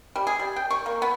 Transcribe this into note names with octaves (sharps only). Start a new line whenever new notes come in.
G3
G#4
G3
G5
C#6
A#3
B3